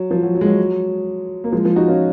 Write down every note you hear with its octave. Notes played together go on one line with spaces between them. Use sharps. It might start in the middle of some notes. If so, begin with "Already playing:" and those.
Already playing: F#3
F3
F#3
F#3
G#3
F#3
A#3
F3 G#3
F3 G#3
D#4 F#4
C#4 F4